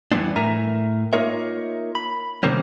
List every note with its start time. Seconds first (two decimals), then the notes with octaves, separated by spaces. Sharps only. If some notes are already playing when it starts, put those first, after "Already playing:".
0.12 F2 E3 G3 B3 C4 D4
0.36 A2 A#4 E5 G#5 A#5
1.13 A#3 D#4 F4 A#4 C#5 E5
1.95 B5
2.43 C3 D#3 G3 A#3 C4 C#4